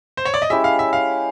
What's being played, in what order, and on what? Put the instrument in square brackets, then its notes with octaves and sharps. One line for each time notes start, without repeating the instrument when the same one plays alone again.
[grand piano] C5
C#5
D5
D#5
[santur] G#3 C#4 E4 G4 [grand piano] E5
[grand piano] F5
E5
F5